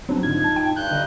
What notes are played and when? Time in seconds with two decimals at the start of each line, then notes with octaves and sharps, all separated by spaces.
0.09 F#3 B3 C4 D4 F#4
0.23 G#2 D3 D#4 F4 G#6
0.44 A5
0.56 G5
0.76 G2 F#6 G6
0.91 D3 D#5 A#5 D#6